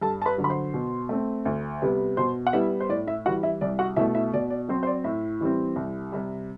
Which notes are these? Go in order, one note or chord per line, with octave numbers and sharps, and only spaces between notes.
G2 A4 A5
A5
B4 B5
D3 F#3
B5
C5 C6
B2
A3 C4
D2
C3 G3 B3
B2 C5 C6
F#5
G3 B3 E4 E5
C5
A2 D5
E4 E5
E3 G3 F#4 F#5
E4 E5
C2 D5
F#4 F#5
B2 A3 E4 E5
E4 E5
B2 D5
D5
F#3 C4 C5
C5
D5
A2 E4 E5
E3 G3 C4
C2
C3 G3